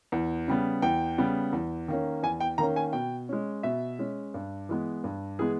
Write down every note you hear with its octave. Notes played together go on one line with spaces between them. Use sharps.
E2
C#3 G3 B3
E2 G5
C#3 G3 B3
E2
D#3 A#3 C#4
E2 G#5
G5
D#3 A#3 C#4 A#5
G#5
B2 G5
G#3 C#4
B2 E5
G#3 C#4
G2
E3 G#3 B3
G2
E3 G#3 B3 G#4